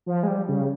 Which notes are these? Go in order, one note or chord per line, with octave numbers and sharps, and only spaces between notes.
F3
G#3
G3
C#3